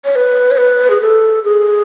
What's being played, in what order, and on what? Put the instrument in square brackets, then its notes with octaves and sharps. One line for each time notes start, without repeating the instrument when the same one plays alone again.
[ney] C#5
B4
C#5
B4
G#4
A4
G#4